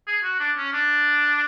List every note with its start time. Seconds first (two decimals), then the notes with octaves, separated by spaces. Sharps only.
0.07 G#4
0.24 F#4
0.40 D4
0.57 C#4
0.73 D4